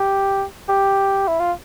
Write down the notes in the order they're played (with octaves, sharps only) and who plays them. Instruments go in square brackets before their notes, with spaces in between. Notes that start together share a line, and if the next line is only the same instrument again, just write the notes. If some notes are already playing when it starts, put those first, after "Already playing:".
Already playing: [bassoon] G4
G4
E4
F4